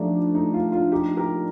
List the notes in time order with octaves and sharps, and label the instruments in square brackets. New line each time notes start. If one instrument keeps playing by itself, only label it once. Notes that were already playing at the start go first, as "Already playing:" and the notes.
Already playing: [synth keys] F3 A3 D4 [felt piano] D#4 F4 G4
[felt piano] D#4
F4
F4
D#4 G4
G4 A#4